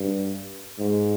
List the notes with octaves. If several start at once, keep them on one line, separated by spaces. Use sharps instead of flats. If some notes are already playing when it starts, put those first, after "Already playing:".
Already playing: G2
G#2